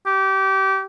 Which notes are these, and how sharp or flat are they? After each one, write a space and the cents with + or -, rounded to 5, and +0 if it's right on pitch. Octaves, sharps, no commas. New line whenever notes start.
G4 -25